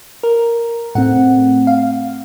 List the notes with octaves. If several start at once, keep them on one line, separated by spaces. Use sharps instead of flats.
A#4
A2 A3 C4 F#5
F5